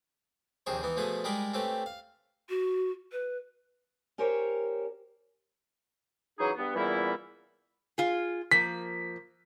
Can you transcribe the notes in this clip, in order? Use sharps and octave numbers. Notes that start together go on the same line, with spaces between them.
A#1 D#2 C3 D#3 G#4 C5
E3 B3 D#4
B2 F3 A3 G#4 B4 D#6
G3 G#3 G#4 A#4 B5 D6
A3 C4 C#4 G4 B4
F5
F#4
B4
C#4 G4 A#4 C5 C#5
C#3 E3 F#3 D#4 G#4
G2 B3
A#2 C#3 E3 G3 B3 E4
F4 G#4
F3 A#3 B6